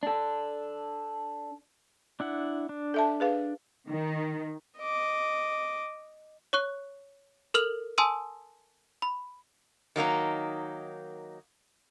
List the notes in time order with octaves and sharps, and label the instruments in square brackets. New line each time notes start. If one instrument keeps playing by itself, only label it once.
[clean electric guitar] D4 A4
[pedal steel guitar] D4 E4 F#5
D4
[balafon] A4 E5 A5
G#4 B4 F5
[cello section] D#3
[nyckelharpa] D#5 D6
[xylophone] C#5 C#6 F#6
A4 A#4 F6 F7 F#7
G#5 A5 C6 D#6 E6 D#7
B5
[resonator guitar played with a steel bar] D#3 F#3 A#3 D#4